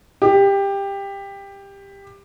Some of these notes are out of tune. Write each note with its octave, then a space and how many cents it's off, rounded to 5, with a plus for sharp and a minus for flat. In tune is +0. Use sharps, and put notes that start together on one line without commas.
G4 +15